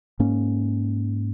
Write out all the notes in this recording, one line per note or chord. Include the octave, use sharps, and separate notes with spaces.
G#2 A#3 C#4